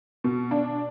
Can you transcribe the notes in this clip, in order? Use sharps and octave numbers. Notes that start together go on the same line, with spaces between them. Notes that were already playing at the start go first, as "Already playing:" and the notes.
B2
D4